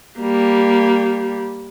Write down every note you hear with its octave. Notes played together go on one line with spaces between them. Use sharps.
G3 A#3